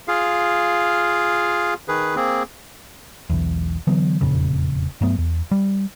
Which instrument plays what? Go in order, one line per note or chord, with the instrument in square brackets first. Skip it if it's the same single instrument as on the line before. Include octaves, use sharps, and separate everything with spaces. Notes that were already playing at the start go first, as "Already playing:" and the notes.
[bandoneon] F4 G#4 F5
D#3 G#4 B4
A#3 C4 G#4
[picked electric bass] E1 B1 E2
D3 E3 F#3 B3
E1 F2 A#2 C#3
G2 F#3 A3 B3
E2
G3